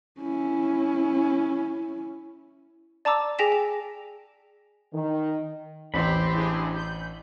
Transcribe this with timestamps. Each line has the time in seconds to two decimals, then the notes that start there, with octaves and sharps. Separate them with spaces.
0.20 C#4 E4
3.05 D5 A5 A#5 D6 E6
3.39 G#4 G5 G#5 A#6 B6 E7
3.52 G5
4.94 D#3
5.94 A1 D#2 A2 C4 G4 B5
6.33 D4 E4 G#4
6.74 G6